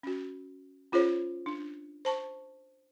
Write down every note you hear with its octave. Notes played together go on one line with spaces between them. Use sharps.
C#4 F#4
C#4 F4 G#4 C5 C#5
D4
C5 A5 C#6